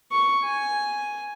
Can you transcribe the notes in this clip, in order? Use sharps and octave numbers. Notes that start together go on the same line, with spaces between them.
C#6
G#5